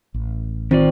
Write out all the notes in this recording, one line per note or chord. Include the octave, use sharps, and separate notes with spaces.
A1
D#3 C4 F4 D5